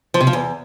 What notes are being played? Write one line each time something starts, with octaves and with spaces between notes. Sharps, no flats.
F3
C3
F3
E2